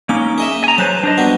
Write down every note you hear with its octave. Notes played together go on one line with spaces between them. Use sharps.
A#3 C#4 D#4 D6
G#4 D#5 E5
G#5 A#5
F#3 B4 C5 A5
D4 C5 D#5
G3 B3 F#4